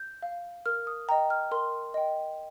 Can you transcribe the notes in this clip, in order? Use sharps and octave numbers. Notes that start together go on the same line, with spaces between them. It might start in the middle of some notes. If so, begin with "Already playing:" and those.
Already playing: G6
F5
A#4 F6
D#6
D#5 G5 A#5
F6
A#4 C6
D#5 G5